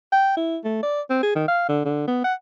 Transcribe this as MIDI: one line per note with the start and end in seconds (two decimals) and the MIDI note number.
0.12 0.35 79
0.37 0.58 64
0.64 0.83 57
0.83 1.01 74
1.10 1.19 60
1.23 1.34 68
1.35 1.44 51
1.48 1.65 77
1.69 1.82 50
1.85 2.07 50
2.07 2.23 59
2.24 2.33 78